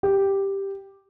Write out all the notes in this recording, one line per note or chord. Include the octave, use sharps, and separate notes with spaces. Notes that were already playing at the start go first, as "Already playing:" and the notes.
G4